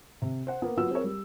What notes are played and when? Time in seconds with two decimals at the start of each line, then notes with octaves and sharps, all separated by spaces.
0.22 C3
0.47 C5 F#5
0.62 A#3 B3
0.77 F#3 B3 F4 E6
0.91 C4 G#4 A#4 C#5
1.04 G3